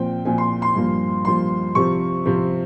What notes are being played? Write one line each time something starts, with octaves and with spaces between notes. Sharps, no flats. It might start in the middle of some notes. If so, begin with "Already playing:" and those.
Already playing: A#2 F3 C4 G5
A#2 F3 C4 G#5
C6
C6
G2 F3 A#3
G2 F3 A#3 C6
C3 F3 C4 C#6
C3 F3 C4